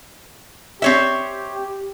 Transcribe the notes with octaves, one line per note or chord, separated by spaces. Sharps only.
C4 G4 C#5 E5